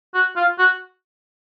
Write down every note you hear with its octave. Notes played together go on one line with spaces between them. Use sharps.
F#4
F4
F#4